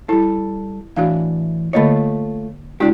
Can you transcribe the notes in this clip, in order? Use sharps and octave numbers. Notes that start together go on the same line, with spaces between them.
G3 E4 A4
A2 E3 D4 F#4 F5
D3 A3 A#3 F4 C#5 D#5
C#2 G#3 D4 E4 F#4 G4